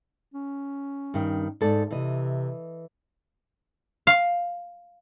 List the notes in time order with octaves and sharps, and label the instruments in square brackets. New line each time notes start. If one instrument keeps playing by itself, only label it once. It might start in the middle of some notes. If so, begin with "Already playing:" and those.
[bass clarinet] C#4
[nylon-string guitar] G2 D#3
G#2 A4 D5
[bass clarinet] C3 [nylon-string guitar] E3 D#5
[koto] F5